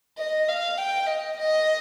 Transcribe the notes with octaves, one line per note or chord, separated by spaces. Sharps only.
D#5
F5
G5
D#5
D#5